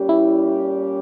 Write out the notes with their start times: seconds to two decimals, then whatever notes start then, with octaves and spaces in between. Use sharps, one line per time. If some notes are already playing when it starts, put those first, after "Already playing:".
Already playing: A#2 G3 C#4 G4
0.09 E4